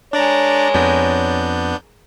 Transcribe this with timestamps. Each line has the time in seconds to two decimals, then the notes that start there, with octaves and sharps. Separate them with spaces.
0.13 G#3 D4 A#4 C#5 D5 A#5
0.75 F2 B3 D4 G6